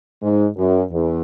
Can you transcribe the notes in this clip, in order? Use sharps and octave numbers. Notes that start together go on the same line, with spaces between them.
G#2
F#2
E2